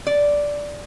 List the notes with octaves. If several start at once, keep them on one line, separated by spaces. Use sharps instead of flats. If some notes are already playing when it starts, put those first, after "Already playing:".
D5